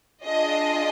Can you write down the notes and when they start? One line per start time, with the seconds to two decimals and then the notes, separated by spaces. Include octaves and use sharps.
0.24 D4 F4 G#4 D#5